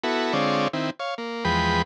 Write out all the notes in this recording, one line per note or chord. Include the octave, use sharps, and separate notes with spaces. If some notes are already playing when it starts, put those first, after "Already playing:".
B3 E4 F#4 A4
D3 G#3 C4 F4 C#5 D5
D#3 C4 E4
C#5 F5
A#3
E2 F3 G#3 B4 G5 B5